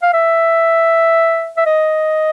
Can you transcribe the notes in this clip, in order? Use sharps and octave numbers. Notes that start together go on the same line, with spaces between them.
F5
E5
E5
D#5